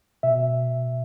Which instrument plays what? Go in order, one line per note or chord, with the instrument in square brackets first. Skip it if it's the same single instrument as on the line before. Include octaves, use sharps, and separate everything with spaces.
[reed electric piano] B2 E5